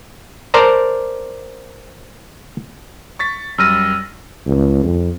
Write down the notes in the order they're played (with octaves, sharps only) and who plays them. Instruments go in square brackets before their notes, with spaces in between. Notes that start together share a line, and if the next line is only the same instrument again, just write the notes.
[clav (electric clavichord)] A#4 C5 D5 A5 A#5
[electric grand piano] C#6 A6 B6
[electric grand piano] F#2 G3 A#6 [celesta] E6 F6 D#7
[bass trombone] C#2
F2